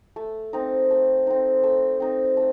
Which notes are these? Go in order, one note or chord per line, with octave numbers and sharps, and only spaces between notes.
A3
C4 D#4
A3
C4 D#4
A3
C4 D#4
A3